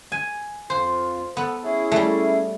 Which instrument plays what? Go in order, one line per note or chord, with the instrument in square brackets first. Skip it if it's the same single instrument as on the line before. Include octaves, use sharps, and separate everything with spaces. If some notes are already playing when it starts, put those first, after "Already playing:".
[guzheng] G#5
[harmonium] F2 F4 [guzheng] C5
[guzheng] B3 [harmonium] A4
[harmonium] C#4 E4 G#4
[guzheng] G3 A3